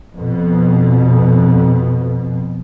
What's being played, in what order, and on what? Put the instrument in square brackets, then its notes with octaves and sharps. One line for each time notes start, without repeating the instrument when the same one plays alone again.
[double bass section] F2 B2